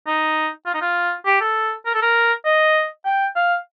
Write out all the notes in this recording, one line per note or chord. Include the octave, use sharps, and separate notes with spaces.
D#4
F4
D#4
F4
G4
A4
A#4
A4
A#4
D#5
G5
F5